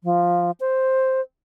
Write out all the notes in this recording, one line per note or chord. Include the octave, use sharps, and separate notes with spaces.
F3
C5